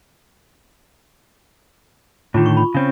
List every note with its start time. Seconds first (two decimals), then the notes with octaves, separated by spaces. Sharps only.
2.34 A2 D3 D#3 F4 D6
2.46 C#6
2.57 B5
2.75 C#3 C4 C#4